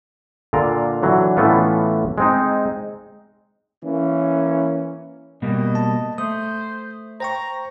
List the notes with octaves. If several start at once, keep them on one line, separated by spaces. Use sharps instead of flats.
A#2 D3 F4 A#4
D3 E3 F#3
A2 E3 A3 B3 C#4 F4
G#3 C4 D#4
E3 A#3 C#4
B2 G3 A#3 D#5
A5
A3 C5 D#6
C5 G5 A#5 C#6